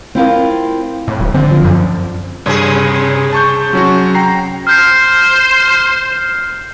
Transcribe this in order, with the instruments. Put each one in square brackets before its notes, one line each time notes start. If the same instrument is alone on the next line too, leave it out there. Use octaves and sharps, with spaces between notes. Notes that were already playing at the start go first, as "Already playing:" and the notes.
[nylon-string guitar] C4 E4 F4 A#4
[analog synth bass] A2
D1
[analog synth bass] D3 [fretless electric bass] C4
[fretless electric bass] F3
[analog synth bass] F#2
[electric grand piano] G2 [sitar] C3 G#4
[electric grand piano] A5 C#6 G6
F#3 C#4 F#4
G5 A#5 C7
[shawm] C5 [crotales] F6 G6 C7